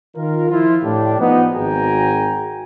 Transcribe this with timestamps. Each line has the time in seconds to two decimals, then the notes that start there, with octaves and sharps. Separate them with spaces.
0.16 D#3 F4 A#4
0.50 F3 E4 F4
0.83 A2 D4 G4
1.20 F3 B3 D#4
1.54 G#1 F#4 G#4 G5 G#5 A#5